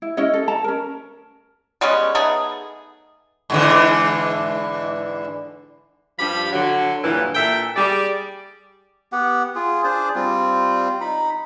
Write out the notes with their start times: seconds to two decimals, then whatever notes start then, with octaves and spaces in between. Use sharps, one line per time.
0.02 E4
0.17 C#4 E4 C#5 D#5
0.34 A4
0.48 A5 A#5
0.64 C#4 A#4
1.81 G3 G#3 B3 C#4
2.15 A3 B3 D#4 G#4
3.50 G#2 D3 E3
6.19 G2 F3 G4 F5 B5
6.53 D3 F#3
7.04 G2 A#2 E3
7.34 A#2 A4 E5 G5
7.76 G3 G#4 D5
9.12 B3 G4 F#5
9.55 F4 G#4
9.84 D4 G#4 C5 D5
10.15 G3 C4 F4
11.01 D#4 B5